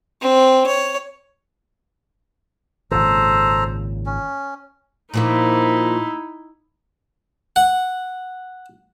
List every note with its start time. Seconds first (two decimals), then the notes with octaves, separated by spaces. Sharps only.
0.21 C4
0.66 C#5
2.91 G#1 A#2 C#3 A4 C5 A#5
4.06 C#4
5.14 A#2 F3 A#3 D#4 E4
7.56 F#5